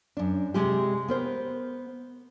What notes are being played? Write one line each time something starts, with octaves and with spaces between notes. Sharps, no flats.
F#2 D4
C3 G#3 G4
B3 A#4 C5